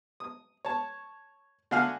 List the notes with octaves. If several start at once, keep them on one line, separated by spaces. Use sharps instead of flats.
D#6
C#5 A5
D3 A3 F#4 F5 G#5 F6